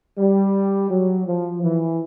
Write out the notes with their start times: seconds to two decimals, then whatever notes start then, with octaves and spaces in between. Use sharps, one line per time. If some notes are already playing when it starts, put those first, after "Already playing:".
0.18 G3
0.90 F#3
1.27 F3
1.63 E3